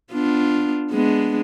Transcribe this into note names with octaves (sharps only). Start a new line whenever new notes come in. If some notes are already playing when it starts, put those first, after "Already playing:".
B3 D4 F4
G#3 B3 D4